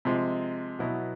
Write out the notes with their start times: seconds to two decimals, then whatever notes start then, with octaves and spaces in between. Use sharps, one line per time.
0.05 C3 F3 G#3
0.79 B2 F#3 B3 E4